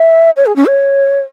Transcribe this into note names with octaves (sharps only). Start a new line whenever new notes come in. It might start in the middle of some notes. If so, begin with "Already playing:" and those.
Already playing: E5
C#5
G#4
C#4
C#5